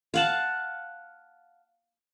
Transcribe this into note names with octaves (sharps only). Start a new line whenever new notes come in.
F5 F#5 A5